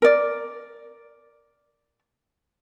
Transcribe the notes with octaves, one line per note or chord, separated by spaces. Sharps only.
A#4 D5